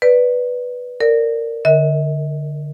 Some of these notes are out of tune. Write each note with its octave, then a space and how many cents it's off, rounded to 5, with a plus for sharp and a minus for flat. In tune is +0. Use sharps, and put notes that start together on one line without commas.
B4 +0 D5 +0
A#4 -20 D5 +0
D3 +0 A#4 +10 D#5 +45